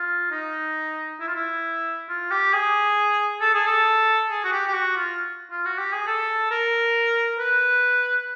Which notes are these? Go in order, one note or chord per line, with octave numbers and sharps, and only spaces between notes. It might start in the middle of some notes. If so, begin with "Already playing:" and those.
Already playing: F4
D#4
E4
F4
E4
F4
G4
G#4
A4
G#4
A4
G#4
F#4
G4
G4
F#4
F4
F4
F#4
G4
G#4
A4
A#4
B4